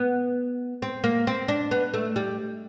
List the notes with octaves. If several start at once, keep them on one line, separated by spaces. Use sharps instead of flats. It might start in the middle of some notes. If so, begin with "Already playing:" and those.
Already playing: B3
C4
A#3
C4
D4
B3
A3
G3